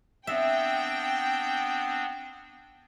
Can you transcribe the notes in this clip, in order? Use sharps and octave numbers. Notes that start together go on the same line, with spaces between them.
B3 C4 D4 E5 G5